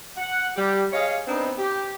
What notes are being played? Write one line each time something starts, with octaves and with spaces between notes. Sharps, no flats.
F#5
G3 G4
G#4 C#5 D#5 F5
B3 C4 D4 D#4
G4